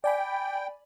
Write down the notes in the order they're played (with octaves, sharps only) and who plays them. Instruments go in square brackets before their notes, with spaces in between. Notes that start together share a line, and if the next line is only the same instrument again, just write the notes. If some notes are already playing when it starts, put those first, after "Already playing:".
[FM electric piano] D5 G#5 B5 [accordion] G5